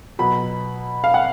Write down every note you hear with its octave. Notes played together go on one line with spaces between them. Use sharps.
B2 F#3 B3 B5
F5
F#5